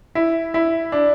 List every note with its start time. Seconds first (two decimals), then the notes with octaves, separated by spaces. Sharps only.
0.15 E4
0.54 E4
0.92 D4